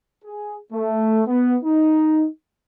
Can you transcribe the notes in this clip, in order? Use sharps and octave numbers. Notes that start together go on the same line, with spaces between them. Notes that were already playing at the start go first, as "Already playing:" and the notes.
G#4
A3
B3
D#4